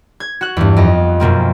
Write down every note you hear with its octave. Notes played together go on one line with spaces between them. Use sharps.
G#6
F#4 F#6
E2 G2
F2 D#5
F#2 B2 A#3 C4